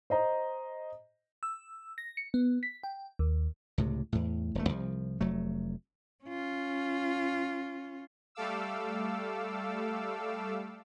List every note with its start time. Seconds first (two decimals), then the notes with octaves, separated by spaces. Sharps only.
0.10 C5 D#5 A#5
1.43 E6
1.98 A#6
2.17 C#7
2.34 B3
2.63 B6
2.83 G5
3.19 D#2
3.78 C#2 A2 C3
4.12 E2 A2
4.55 D#1 A3
4.69 C2 F3
5.21 F1 F#3 A3
6.24 C#4 F4
8.35 G3 A3 A4 F5 D6 E6